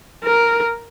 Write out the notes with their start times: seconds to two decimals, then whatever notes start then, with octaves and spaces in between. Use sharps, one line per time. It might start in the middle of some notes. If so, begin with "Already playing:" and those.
0.24 A#4